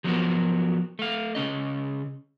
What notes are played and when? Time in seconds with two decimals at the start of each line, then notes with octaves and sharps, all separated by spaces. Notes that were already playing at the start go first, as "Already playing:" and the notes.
0.04 F3 F#3 A3 B3 F#4 A#4
0.99 A3 F5
1.35 C#3 E3 C#4 D#5